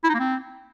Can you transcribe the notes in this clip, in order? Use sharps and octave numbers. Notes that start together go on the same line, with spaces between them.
E4
D#4
A#3
C4